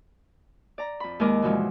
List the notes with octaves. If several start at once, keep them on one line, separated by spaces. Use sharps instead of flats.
D5 A#5
F2 B5
D#2 G#3 A#4 D#5 D6
G2 B2 E3 F3 G#3